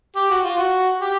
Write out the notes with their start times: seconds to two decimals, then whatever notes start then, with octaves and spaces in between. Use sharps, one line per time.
0.16 G4
0.30 F#4
0.44 F4
0.58 F#4
1.01 G4